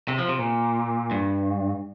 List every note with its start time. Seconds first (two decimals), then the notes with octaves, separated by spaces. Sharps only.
0.08 C3
0.18 F3
0.29 C3
0.38 A#2
1.11 G2